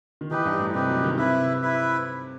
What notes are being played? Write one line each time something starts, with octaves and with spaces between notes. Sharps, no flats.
D#3
E3 D#4 G4 B4
G2
A2
C3 D#4 G4 B4
F#3
D#3
C3 E4 B4 E5
E4 B4 E5